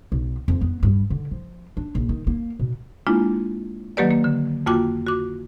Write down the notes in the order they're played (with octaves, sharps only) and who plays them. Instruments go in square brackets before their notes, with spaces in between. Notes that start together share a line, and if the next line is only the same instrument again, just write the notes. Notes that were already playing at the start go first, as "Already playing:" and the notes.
[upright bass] B1
F2
B3
G2
D3
F3
D4
A#1
D#3
A#3
B2
[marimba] G#3 A#3 D4 E4 F4
D#3 F#3 A#3 G4 B4 D5
A#3
D3
F2 A#3 F4 F#4 G5 D6
F#4 D6